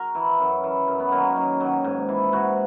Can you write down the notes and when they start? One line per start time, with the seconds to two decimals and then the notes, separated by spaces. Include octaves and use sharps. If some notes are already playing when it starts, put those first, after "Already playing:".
Already playing: F#4 A#4
0.15 E3
0.40 F#2
0.64 E3
0.88 F#2
1.00 B3
1.12 D#3 F#3 A#3
1.24 C#4
1.36 F#2 D#4
1.60 D#3 F#3
1.84 G#2
2.09 E3
2.33 G#2 F#4